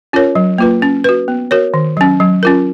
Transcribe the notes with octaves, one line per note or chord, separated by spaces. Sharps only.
C#4 F4 A#4 C#5
F#3
A#3 F4 B4
C#4
F#4 B4
B3
F#4 A#4 C#5
D#3
F#3 C#4
F#3
C#4 F4 A#4